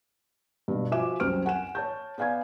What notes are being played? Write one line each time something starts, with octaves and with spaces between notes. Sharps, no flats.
G2 B2
F3 F#4 E5 G#5 D6 E7
C2 F#2 C4 F6 D7
F#5 G#5 E7
C#5 A5 G6
B3 D5 F5 G#5 G#6